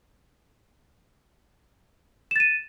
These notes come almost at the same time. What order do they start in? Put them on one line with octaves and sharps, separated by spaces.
E7 A6 D#7